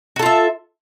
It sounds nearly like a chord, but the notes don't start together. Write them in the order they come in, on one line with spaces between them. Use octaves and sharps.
F#4 A4 F4 E5